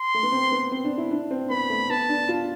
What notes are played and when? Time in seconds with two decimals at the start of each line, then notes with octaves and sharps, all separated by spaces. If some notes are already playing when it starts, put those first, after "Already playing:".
Already playing: C6
0.14 A3
0.23 B3
0.32 C4
0.52 B3
0.72 C4
0.85 D4
0.98 E4
1.11 D4
1.31 C4
1.50 B3 B5
1.70 A3
1.90 B3 A5
2.09 D4
2.29 F4